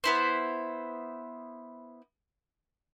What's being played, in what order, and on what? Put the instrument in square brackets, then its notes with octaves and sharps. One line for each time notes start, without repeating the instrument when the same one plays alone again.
[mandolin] B3 E4 C5